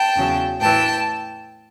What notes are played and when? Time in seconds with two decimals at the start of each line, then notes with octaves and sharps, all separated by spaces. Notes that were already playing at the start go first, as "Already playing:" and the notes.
Already playing: G5 A5
0.16 E2 C#3 F#3
0.59 A2 E3 G5 A5